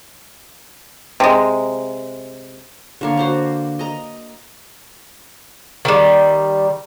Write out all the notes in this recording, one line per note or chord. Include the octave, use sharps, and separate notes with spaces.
C3 G#3
D3 A#3 C#5
F#4 C5 F5
D#5 A#5
D#3 G3